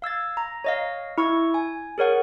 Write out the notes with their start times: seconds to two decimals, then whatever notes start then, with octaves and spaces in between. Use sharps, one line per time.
0.02 F5 E6 G#6 A6
0.37 A#5
0.64 C#5 D#5 F5
1.18 E4 C#6 E6 G#6
1.54 G#5
1.98 G#4 A#4 C#5 F#5